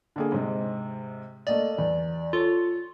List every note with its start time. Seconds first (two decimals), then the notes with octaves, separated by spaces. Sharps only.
0.16 D3 A#3 G#4
0.32 G#2 C3 D#5
1.47 A3 A#3 D5 D#5
1.78 E2
2.33 F4 A4 C#5